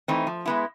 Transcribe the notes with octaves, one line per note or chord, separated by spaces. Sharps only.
E3 A3 C4 D#4
F3
G#3 B3 E4